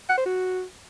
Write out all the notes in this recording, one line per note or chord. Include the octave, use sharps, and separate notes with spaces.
F#5
C5
F#4